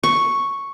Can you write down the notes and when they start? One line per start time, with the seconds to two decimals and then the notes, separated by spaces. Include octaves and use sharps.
0.04 C#6